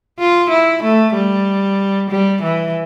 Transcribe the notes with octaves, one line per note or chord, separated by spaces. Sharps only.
F4
E4
A3
G3
G3
E3